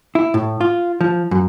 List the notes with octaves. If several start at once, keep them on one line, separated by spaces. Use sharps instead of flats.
E4
A2
F4
F3
F#2